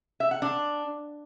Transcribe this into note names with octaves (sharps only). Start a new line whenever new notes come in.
E5
F#5
D4